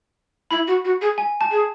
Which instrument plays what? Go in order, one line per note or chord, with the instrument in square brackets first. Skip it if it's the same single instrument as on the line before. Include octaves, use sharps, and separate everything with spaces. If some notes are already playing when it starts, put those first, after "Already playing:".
[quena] E4 [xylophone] B5
[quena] F#4
F#4
G#4
[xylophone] G#5
A5
[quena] G#4